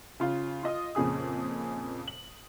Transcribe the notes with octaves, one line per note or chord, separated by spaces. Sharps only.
C#3 F4
F4 D#5 D#6
F2 A#2 C#3 G#4 D#6
F#7